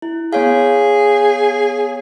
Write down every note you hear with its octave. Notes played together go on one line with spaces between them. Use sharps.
E4
B3 G#4 C#5 F5